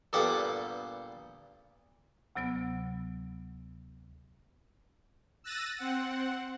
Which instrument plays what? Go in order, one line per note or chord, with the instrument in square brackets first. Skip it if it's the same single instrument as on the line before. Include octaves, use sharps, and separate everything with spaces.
[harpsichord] G2 A#2 B3 G4 A4 F#5
[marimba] D2 C3 F#3 B3 E6
[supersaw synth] E6 F#6 A6 A#6 D#7
C4 F#5